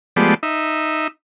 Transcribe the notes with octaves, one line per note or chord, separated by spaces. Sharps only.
F3 G#3 A3 B3 G4 D5
D#4 E5